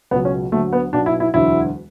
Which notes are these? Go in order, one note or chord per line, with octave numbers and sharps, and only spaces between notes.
C#2 B2 F#3 B3
C#4
D2 D3 F#3 A3
B3
B1 B2 F#3 D4
E4
E4
E1 D2 D3 F#3 E4